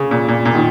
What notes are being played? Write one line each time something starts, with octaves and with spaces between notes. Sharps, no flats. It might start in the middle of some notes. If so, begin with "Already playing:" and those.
Already playing: C#3
A#2
A#2
A#2
D#3